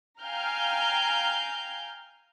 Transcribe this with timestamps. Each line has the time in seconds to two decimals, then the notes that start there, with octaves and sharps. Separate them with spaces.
0.22 F5 G5 G#5 A#5 F6 G6